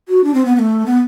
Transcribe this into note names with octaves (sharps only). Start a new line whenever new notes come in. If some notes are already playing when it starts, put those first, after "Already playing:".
F#4
D4
C4
B3
B3
A3
B3